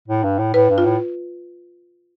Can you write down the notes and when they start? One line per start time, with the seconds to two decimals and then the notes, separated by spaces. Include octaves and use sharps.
0.08 A2
0.24 G2
0.39 A2
0.54 A2 B4
0.70 G2
0.78 F4
0.85 A2